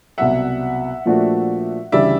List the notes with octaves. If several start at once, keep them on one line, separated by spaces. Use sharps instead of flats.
C2 B2 F#3 E5 F#5
A#2 F3 A3 D4 F#4
D2 C#3 E3 G3 D5 E5